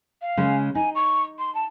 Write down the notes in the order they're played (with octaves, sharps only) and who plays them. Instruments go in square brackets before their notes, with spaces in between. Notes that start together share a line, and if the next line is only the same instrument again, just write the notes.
[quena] F5
[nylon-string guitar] C#3 G#3
[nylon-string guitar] D#4 [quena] G#5
[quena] C#6
C6
A5